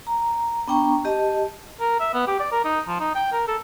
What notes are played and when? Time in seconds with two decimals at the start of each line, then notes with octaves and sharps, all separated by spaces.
0.07 A#5
0.68 B3 D4 G5 A#5 C#6
1.05 G4 D#5 A5
1.80 A#4
2.00 E5
2.14 B3
2.27 G4
2.40 D5
2.52 A#4
2.65 D#4
2.88 F3
3.00 D#4
3.15 G5
3.33 A#4
3.48 A4